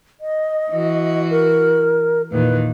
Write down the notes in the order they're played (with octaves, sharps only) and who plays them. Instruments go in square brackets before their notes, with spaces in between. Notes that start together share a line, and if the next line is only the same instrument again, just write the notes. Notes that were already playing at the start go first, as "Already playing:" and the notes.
[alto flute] D#5
[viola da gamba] E3 F#4
[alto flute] A#4
[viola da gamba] E2 A#2 D#3 [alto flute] B4